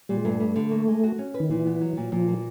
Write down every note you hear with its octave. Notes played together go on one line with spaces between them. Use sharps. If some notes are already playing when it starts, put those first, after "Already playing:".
A#2 G3
G#3
G2 A3
G3
D3
A#3
G#3
F#4
C#4
B4
D#3
A#2 E3
B3
F#3
A#2
A#2 F3
A#3